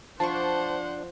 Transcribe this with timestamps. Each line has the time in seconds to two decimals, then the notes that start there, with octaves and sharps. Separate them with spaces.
0.20 F3 D4 C5 F#5 A5 C6 C#6